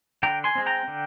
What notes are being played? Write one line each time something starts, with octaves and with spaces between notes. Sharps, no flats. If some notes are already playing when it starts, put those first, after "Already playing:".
D3 G5 A#5
G#5 C6
G#3 C4
G5 A#5
D3